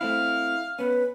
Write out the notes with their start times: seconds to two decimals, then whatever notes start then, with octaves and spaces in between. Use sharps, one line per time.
0.01 A3 C4 E4 F5
0.79 B3 C#4 B4